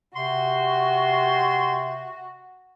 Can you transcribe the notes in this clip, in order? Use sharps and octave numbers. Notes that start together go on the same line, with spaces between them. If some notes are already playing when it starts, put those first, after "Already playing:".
C3 F#4 C6